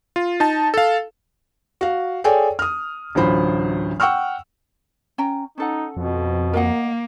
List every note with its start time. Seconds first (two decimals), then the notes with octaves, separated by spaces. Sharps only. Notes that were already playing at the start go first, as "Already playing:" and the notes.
0.16 F4
0.40 D#4 A5
0.74 A4 F5
1.81 F#4 F5
2.24 G#4 A4 C#5 D5 G5 G#5
2.59 D#6 F6
3.15 A1 D2 F#3 F4 C5 B5
4.00 F#5 G5 C#6 E6 F6
5.18 C#4 G5 A#5
5.58 C#4 D#4 A4 F#5
5.97 F2 B2
6.54 A#3 A#4 D#5 F#5